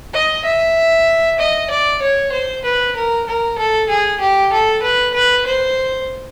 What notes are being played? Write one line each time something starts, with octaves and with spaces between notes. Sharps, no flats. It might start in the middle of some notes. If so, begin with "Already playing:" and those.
D#5
E5
D#5
D5
C#5
C5
B4
A#4
A#4
A4
G#4
G4
A4
B4
B4
C5